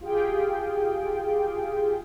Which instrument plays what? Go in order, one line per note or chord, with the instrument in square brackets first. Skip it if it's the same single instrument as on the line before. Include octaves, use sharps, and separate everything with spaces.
[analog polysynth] F4 G4 G#4 G5